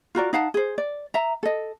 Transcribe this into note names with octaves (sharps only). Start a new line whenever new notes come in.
F4 F#4 A#4 D5
D#4 F5 F#5 A5
G#4 C5
D5
E5 A#5
A4 D#5